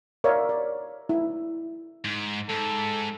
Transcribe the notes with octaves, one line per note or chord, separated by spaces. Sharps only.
A#4 C#5 D5 E5 F5
D5
E4
G#2
G#2 A4